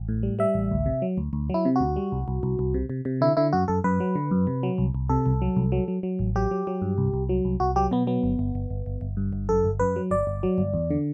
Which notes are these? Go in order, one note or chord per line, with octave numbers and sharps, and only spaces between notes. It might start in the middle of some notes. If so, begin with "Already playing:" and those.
Already playing: A1
A2
G3
G3 E5
A1
D2
C3
F#3
D2
D2
F#3 E4
C3
D2 F#4
G3
C2
C2
C2
C2
C3
C3
C3
D3 E4
D3 E4
F#2 F#4
F#2 A4
F#2 B4
F#3
D3
F#2
C3
F#3
C2
C2
C3 A4
C2
F#3
C2
F#3
F#3
F#3
A1
F#3 G4
F#3
F#3
G2
C2
C2
F#3
C2
C2 F#4
F#3 G4
B2 B3
F#3 B3
G1
G1
G1
G1
G1
G1
G2
G1
F#2 A4
G1
F#2 B4
F#3
G1 D5
G1
F#3
G1
E2
D3